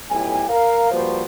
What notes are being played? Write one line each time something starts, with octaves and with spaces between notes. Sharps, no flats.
B1 A2 E4 G4 G#5
A#4 F5
F3 G3 A#3 F#4 B4 C5